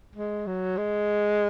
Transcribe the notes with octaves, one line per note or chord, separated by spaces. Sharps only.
G#3
F#3
G#3